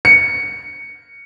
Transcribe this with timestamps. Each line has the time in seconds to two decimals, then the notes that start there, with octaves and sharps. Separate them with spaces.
0.05 C#7